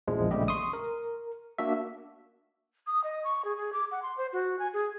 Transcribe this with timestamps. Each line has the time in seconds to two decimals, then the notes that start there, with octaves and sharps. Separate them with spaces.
0.08 A#1 E2 F3 G#3
0.31 A#1 C#3 G3 A3 G4 D#5
0.48 C6 C#6 D#6
0.73 A#4
1.58 A#3 D4 F#4 E5
2.87 D#6
3.04 D#5
3.24 C#6
3.45 G#4
3.57 G#4
3.73 D6
3.91 F#5
4.02 C6
4.18 C5
4.33 F#4
4.59 G#5
4.74 G#4